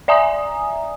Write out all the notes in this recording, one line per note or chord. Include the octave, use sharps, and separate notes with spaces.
D5 E5 G#5 A#5 D#6